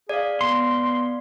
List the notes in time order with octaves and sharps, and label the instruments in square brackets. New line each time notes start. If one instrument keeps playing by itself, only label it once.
[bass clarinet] G#4 [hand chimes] D5 F5
[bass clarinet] B3 [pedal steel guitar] C6